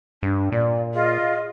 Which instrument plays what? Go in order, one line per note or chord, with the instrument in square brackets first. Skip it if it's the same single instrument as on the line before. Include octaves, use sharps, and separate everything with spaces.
[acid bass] G2 [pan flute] D4
[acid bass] A#2 [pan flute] D5
[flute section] F4 D#5 [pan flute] G#4